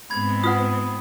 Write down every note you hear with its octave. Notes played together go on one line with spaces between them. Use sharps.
G#2 B3 C4 B5 G#6
F4 B4 F#5 D#6